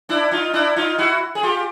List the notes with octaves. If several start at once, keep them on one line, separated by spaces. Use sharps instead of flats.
D4 E4
D#4 F4
D4 E4
D#4 F4
E4 F#4
G#4
F4 G4